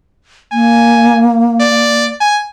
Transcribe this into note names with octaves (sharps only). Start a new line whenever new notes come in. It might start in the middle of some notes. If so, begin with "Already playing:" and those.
A#3 G#5
D5
G#5